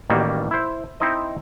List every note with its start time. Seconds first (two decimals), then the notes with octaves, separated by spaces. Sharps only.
0.10 A1 D#3 G3 A#3 F#4
0.51 E4 C5
1.00 C4 D#4 E4 C5 D#5